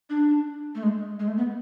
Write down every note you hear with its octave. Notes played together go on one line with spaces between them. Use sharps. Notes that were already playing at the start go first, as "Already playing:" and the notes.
D4
A3
G#3
G#3
A3
B3